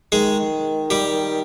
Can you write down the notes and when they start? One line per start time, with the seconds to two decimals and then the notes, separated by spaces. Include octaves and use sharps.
0.12 D#3 G#3 G#4
0.90 G3 G4